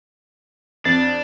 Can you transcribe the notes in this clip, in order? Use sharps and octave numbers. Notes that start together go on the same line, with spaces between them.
F2 D4 A6